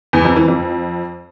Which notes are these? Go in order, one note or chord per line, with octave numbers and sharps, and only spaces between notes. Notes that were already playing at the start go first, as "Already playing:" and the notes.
E2
F2
E3
F2